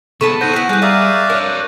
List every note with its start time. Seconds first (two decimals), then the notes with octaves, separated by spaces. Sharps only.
0.21 C3 B3 G#4 A4 B4 A5 C#6
0.41 B3 D#4 C5 F#5 G6 A#6 D#7
0.54 B3 E4 G#4
0.69 G3 G#4 B4 F#6 G6
0.82 G#4 A#4 D5 E5 F5
1.30 D4 A#4 C#5